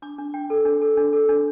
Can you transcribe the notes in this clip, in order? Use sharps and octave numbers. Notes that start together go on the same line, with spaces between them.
D4 D6
D4
D4 G5
A4
D4
A4
D4
A4
D4